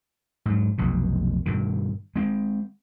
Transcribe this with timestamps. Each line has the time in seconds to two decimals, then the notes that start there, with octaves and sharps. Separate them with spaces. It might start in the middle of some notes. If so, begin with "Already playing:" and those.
0.46 G#2 F#3
0.78 F1 B1 B2
1.46 G2 B2 D#3
2.16 G#3 C4